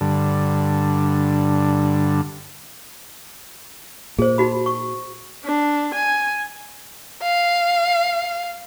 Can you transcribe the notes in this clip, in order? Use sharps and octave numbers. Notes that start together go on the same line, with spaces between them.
G2 D3
A#2 G#4 C5
D#4 F#4 B5
C#6
D4
G#5
F5